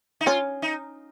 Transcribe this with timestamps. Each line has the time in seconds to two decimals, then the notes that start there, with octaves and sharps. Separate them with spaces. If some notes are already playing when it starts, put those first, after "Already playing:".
0.21 D#4
0.26 C#4 F4
0.62 D#4